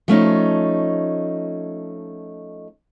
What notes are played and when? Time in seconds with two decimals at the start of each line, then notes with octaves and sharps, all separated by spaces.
0.08 F3 A3 C#4 D#4